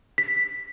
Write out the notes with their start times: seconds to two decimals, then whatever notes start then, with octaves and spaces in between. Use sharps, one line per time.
0.18 B6